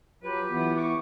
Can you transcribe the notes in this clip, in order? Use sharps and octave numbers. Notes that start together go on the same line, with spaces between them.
F#3 F4 G4 B4
E3 B3
C#6 D6